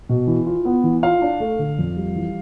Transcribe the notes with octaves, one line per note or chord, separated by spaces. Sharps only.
B2
E3
F4
B3
E3
F4 F5
D4
A3
D3
F2
G3
E3